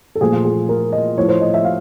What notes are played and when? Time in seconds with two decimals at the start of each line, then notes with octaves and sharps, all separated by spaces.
0.15 A4
0.21 A#2 F3 A3 G#4
0.33 F4
0.45 G#4
0.69 A#4
0.93 D#5
1.17 A2 F3 A3 C#5
1.28 C5
1.41 D#5
1.54 E5
1.65 F5